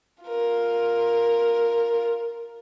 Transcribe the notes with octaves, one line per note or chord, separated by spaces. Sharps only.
F4 A#4